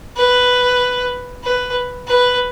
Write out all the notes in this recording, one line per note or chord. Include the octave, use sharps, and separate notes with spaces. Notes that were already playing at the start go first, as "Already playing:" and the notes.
B4
B4
B4